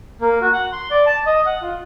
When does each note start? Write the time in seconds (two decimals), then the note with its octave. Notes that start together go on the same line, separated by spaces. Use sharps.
0.21 A#3
0.41 F#4
0.53 F#5
0.72 C6
0.91 D5
1.06 A5
1.26 D#5
1.46 F#5
1.62 F4